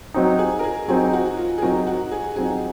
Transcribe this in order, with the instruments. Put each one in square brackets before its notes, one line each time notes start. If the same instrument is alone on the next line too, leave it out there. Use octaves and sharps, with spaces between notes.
[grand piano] F#3 C4 D#4
[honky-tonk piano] G#4
A#4
G#4
[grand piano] F#3 C4 D#4 [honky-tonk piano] G#4
[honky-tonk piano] F#4
F4
G#4
[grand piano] F#3 C4 D#4 [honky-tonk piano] A#4
[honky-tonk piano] F#4
G#4
[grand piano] F#3 C4 D#4 [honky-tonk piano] G#4